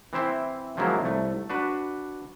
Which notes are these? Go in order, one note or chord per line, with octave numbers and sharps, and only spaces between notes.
E3 C4 E4 C5
F3 F#3 G#3 A#3 B3 E4
C2 A3
D4 F#4 B4